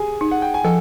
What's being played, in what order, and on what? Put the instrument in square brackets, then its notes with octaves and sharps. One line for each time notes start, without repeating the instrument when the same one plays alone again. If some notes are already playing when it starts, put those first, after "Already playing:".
Already playing: [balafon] G4 [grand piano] G#4 G#5
[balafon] D#4
[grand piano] F#5
G5
G#5
[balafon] F3 [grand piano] A4 A5